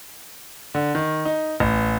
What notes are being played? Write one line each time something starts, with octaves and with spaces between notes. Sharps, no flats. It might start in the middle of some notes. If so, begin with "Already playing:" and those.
D3
D#3
D#4
A1